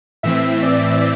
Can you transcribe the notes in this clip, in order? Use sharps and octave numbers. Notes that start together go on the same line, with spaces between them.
A2 E3 C4 E5
D5